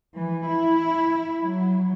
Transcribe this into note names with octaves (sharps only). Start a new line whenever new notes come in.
E3
E4
F#3